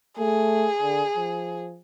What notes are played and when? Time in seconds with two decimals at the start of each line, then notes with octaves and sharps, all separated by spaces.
0.19 A3 G#4
0.81 D3
1.17 F3